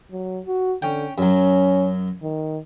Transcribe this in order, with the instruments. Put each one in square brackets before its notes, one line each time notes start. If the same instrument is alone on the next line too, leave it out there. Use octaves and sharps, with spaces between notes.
[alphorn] F#3
F#4
[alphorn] D3 [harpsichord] C#4 G5
[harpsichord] F#2 F#3 [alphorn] C#4
[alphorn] D#3